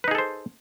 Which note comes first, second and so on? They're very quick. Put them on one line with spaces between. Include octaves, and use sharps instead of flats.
B4 D#4 G#4 A4 C5